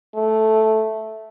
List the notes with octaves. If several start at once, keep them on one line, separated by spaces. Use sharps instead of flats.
A3